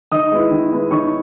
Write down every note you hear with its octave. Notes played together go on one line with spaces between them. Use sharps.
D#3 D#5 D#6
G#3 B3 E4
D#3
G#3 B3 E4
D#3 C#5 C#6